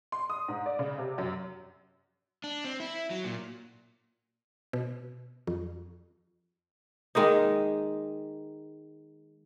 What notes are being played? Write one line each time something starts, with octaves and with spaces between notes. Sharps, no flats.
C6
D#6
G#2
D5
C#3
C3
F#2
D4
C4
E4
F#3
A#2
B2
F2
D#3 G#3 A#3 D#4